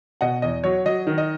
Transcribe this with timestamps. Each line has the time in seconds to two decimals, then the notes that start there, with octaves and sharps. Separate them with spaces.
0.21 B2 D#5 F#5
0.42 E2 D#5
0.64 F#3 C#5
0.86 F#3 D#5
1.07 D#3
1.18 D#5